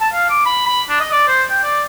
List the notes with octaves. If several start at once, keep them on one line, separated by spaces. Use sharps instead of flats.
A5
F5
D6
B5
B5
D4
D#5
D5
C5
G5
D5